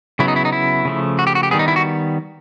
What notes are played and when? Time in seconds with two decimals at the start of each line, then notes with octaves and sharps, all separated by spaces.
0.19 C#3 F#3 B3 E4
0.28 D#4
0.36 E4
0.45 D#4
0.52 E4
0.85 C#3 F3 A3
1.19 F#4
1.27 G4
1.35 F#4
1.43 G4
1.51 D#3 G3 B3 G#4
1.59 D#4
1.68 E4
1.76 F#4